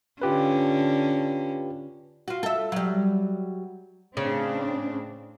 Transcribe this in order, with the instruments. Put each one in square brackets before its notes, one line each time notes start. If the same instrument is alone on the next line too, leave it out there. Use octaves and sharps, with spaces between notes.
[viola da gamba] D3 C#4 [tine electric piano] F4 G4 B4
[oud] F4 F#4
A4 E5
F#3 G3
[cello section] A2 C4 D4 [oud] C#3